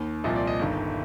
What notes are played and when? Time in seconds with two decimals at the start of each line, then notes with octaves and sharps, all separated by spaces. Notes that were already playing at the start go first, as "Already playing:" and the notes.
Already playing: D#2 D#3
0.24 C2 A#2 F3 D#5
0.36 D5
0.47 D#5
0.59 G1 G2 D#3